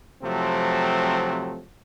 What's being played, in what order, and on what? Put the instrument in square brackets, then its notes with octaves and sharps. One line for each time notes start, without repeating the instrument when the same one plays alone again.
[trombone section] C3 F3 F#3 A3 C4